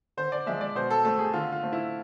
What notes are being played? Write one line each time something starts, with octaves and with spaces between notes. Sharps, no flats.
D3 C5
D5
F3 G#3 E5
D5
B2 C5
A4
A3 C4 A4
G#4
D3 F4
F4
A3 C4
E4